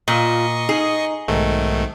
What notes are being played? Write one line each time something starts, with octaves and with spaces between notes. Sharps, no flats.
A#2 F4 D#5 C#6 C7
D#4 G#4
B1 G#2 D#3 A3